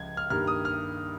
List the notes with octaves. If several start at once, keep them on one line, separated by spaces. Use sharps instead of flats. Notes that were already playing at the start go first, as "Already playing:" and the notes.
Already playing: C#2 C#3 F3 G#6
F6
G2 D#3 G3 A#3 F6
D#6
F6